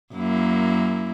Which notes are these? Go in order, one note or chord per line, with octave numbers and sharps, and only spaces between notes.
F#2 A#3 E4